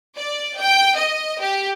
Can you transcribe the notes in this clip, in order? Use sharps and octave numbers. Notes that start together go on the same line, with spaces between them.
D5
G5
D#5
G4